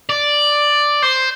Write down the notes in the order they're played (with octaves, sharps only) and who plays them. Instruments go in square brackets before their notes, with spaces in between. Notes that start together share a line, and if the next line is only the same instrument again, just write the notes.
[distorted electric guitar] D5
C5